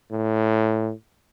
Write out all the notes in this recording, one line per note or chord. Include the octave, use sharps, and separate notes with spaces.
A2